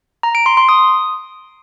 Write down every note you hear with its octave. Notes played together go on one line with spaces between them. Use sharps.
A#5
D7
C6
C6
D#6